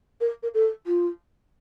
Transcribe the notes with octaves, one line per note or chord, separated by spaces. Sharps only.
A#4
A#4
A4
F4